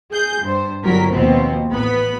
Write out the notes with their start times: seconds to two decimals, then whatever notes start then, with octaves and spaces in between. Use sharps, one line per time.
0.12 G#4 G6
0.42 G2 C5
0.81 G1 F#3 G3 A#4 B6
1.12 D#2 B2 F3 B3 C4
1.70 A1 B3 B5